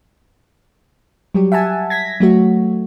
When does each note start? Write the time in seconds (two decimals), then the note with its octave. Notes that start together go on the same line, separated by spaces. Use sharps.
1.34 F#3 G3 G4
1.52 E5 F#5 G#5 A5
1.90 G#6 A#6 B6
2.20 F#3 A3 F#4